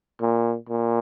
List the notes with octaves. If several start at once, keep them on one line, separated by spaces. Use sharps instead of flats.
A#2
A#2